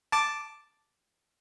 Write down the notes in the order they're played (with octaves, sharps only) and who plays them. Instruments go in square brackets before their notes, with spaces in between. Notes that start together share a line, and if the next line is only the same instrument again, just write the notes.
[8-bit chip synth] A5 D6